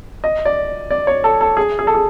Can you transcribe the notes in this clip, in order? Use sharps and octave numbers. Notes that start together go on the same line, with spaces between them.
D#5
D5
D5
C#5
A4
A4
G#4
G#4
A4
G#4